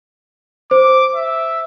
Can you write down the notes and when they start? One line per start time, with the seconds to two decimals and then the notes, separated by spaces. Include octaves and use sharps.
0.71 C5 D6
1.15 E5